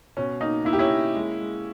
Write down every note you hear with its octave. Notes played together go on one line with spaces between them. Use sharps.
B2 C#4
A#3 D#4
A#3 E4
G4
C#4 E4
A#3
G#3
G#3